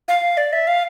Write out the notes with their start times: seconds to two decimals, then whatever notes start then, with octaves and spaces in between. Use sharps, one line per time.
0.08 F5
0.37 D5
0.53 E5
0.67 F5